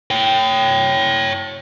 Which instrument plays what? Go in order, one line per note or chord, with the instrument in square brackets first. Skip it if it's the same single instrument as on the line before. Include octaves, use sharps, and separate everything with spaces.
[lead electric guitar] C#5 G5